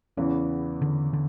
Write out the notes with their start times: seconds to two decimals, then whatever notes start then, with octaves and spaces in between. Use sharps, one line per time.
0.17 E2 C#3 E3 B3 C#4
0.82 D3
1.13 D3